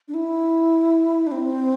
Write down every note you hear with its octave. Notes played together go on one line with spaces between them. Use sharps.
D4
E4
D4
C4